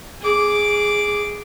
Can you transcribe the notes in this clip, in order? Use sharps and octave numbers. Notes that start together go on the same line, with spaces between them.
G#4 D6